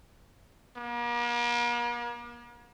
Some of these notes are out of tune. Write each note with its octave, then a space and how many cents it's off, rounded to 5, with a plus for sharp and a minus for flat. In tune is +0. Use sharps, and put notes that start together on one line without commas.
A#3 +45